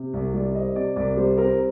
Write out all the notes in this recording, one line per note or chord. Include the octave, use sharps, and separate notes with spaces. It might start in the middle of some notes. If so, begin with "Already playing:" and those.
Already playing: C3
C2
G3 D5
C4 D#5
C3 D5
C2 D5
G3 C5
C4 A#4